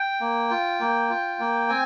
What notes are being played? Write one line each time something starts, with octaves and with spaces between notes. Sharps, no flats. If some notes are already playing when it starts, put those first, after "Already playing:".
Already playing: G5
A#3
F4
A#3
F4
A#3
C4 G#5